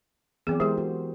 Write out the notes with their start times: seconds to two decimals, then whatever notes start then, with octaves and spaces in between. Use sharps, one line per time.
0.47 E3 F#3 B3 C4 G#4
0.60 G#3 G4 G#4 A#4 C5
0.77 F#4